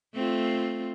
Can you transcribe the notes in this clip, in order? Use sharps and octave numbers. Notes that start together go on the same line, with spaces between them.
A3 C4 F4